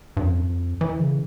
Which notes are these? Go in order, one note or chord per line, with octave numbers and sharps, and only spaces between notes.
G2
F2
E3
C#3